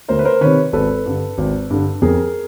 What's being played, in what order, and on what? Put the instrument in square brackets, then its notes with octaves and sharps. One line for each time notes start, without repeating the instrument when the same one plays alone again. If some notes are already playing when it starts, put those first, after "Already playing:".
[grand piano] D2 A#4 C5
B4
A#4 C5
C3 D#3 B4 C#5
G#1 A4 B4
G2 D3
G#1
G2 D3
F2 G#4 A#4